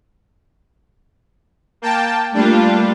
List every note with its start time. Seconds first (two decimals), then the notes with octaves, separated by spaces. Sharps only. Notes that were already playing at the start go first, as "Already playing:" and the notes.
1.82 A#3 G5 A5
2.34 G3 A3 A#3 D4 F4